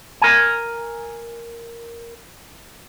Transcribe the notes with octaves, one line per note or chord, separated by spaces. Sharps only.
A#4 G#5